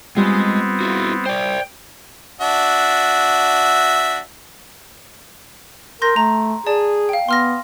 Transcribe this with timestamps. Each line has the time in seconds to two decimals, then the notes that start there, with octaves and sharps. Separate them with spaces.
0.17 G3 G#3 B3 C4 F4
0.81 E4 F#4
1.26 C5 D5 G5
2.41 D4 F#4 E5
6.02 A#4 C6 G6 A#6
6.16 A3 A#5
6.67 G#4 D5 A5
7.09 F5 G5
7.29 B3 C6 F6 A#6